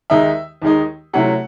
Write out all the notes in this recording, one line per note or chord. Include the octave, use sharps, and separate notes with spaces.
D#2 D#3 G#3 D#4 E5
D#2 D#3 G#3 D#4
C3 F#3 A3 C#4 E4 F#5